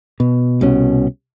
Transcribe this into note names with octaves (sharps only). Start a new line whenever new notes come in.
B2
C2 B2 C#4